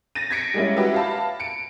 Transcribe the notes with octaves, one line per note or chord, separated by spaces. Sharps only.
A6 A#6 D#7
G#6 A#6 B6 C#7 D7
G3 G#3 A#3 C#4 E4
F#4 G4 B4 E5
F5 A5 B5
C#7 D7